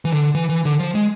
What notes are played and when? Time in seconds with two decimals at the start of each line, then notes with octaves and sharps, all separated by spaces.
0.05 E3
0.12 D3
0.35 E3
0.50 E3
0.65 D3
0.79 F3
0.95 G#3